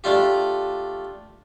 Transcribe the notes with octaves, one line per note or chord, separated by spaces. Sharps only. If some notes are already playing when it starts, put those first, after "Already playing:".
A3 D4 F4 G4